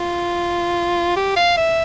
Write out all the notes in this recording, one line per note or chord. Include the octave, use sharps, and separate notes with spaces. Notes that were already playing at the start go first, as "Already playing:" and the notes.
Already playing: F4
G4
F5
E5